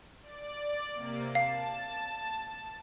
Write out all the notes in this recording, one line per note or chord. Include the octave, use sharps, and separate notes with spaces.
D5
C3 A#3
F5 A5